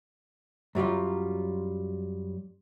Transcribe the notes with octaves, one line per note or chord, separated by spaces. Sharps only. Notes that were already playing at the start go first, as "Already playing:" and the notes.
F#2 F#3 G3 F4